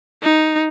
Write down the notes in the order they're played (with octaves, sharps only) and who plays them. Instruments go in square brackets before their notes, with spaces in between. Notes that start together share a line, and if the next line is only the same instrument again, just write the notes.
[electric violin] D#4